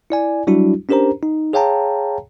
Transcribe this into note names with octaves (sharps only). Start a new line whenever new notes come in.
E4 D5 G#5
F#3 G3 D4 E4 F#4
C#4 D4 G4 A#4 C5 A#5
D#4
G#4 C#5 F5 G5 A5 A#5